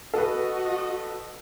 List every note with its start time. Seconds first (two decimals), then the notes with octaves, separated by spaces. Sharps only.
0.14 F#4 A4 B4 D#5